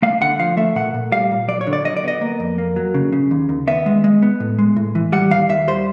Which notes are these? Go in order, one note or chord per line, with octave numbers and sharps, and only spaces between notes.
A3 F5
D3 F#5
F3 F5
A3 E5
A#2 F#5
A#2
G3 F5
A#2
F#3 D5
C#5
D3
D5
F#3 D#5
D5
B3 D#5
A#3
F2
A#3
F#3
C#3
C#3
D#2
D#2
B3 E5
G#3
G#3
B3
A2
G#3
A2
E3
G3 F#5
D#2 F5
D#2 E5
G3 C5